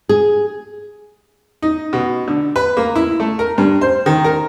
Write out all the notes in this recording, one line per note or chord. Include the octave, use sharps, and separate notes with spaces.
G#4
D#4
B2
D3
B4
A#3
E4
A3
A#4
G2
C5
D#3
A#4